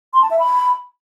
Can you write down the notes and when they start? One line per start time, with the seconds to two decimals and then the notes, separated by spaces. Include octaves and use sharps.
0.13 C6
0.22 A5
0.31 E5
0.39 B5